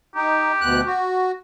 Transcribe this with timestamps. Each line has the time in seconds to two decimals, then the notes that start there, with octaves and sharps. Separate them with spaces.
0.15 D#4 G4
0.61 D2 B2 F#6
0.86 F#4